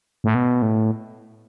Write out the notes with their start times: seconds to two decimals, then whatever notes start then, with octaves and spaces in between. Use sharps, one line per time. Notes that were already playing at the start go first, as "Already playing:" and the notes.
0.24 A2
0.35 B2
0.62 A2